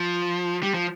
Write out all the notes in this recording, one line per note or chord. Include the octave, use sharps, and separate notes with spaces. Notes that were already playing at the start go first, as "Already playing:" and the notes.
Already playing: F3
G3
F3